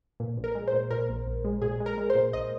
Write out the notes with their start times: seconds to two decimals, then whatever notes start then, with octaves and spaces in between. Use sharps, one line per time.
0.20 A#2
0.37 A#1
0.44 A#4
0.55 G#3
0.67 C5
0.73 A#2
0.90 A#2 A#4
1.09 A#1
1.27 A#1
1.45 G#3
1.62 A#2 G#4
1.80 G#3
1.86 A#4
1.98 G#3
2.10 C5
2.15 A#2
2.33 A#1 D#5